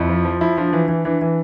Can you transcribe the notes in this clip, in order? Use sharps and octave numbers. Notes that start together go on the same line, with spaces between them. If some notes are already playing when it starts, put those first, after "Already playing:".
Already playing: F2 E4
F3
F3
F3 E4
F3 D4
E3
E3
E3 D4
E3